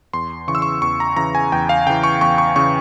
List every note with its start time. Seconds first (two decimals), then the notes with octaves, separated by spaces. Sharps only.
0.13 E2 C6
0.48 C#3 E3 C#6
0.55 E6
0.62 C#6
0.82 E2 C#6
1.00 A#5
1.16 C#3 E3 A#5
1.35 G#5
1.52 E2 G5
1.69 F5
1.86 C#3 E3 G5
2.04 C#6
2.21 E2 C#6
2.38 C#6
2.56 C#3 E3 C#6